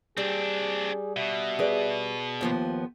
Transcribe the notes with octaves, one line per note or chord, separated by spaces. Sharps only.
G3 C4 D4 G#4
B2 E5
G#4 B4 D5
D#2 F3 B3 F4